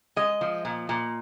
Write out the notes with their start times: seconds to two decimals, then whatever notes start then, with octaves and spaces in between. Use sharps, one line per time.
0.16 G#3 D#5
0.41 F3
0.65 A#2
0.89 A#2